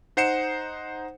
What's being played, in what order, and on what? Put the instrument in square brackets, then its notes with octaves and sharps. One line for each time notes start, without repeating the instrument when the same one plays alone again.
[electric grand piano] D#4 C5 F#5 C7 C#7 E7